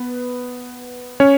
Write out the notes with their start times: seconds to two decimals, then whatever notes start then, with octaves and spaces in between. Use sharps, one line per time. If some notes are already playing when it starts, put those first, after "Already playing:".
Already playing: B3 B4
1.20 C#4 C#5